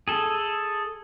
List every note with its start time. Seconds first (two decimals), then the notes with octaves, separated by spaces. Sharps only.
0.08 G#4 A4